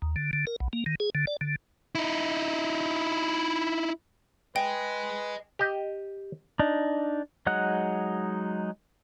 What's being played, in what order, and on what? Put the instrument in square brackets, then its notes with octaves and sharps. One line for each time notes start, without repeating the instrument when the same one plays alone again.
[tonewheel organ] D#2
D3
D3
A#4
B1
A#3
D#3
G#4
D3
D5
D3
[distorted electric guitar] D#4 E4
[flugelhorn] B4 [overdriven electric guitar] D#5 G#5 [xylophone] G5
[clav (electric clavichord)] G4 D#5
[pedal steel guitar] D4 D#4
F#3 G#3 D#4 F#5 F#6